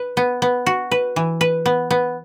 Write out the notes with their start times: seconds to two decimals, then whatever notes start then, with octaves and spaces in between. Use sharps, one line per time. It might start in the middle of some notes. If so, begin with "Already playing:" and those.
Already playing: B4
0.17 B3
0.42 B3
0.66 F#4
0.91 B4
1.16 E3
1.41 B4
1.66 B3
1.91 B3